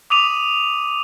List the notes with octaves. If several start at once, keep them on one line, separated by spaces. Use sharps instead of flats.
D6 D#6 D#7 F7